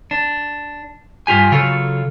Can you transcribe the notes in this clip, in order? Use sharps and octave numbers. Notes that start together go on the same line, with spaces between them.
D4
G2 F4 G4 G#5
C#3 F#3 F4 A4